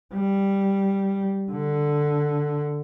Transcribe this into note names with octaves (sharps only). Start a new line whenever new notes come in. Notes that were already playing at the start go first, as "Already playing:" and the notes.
G3
D3